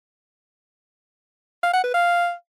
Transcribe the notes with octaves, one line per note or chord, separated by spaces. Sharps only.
F5
F#5
B4
F5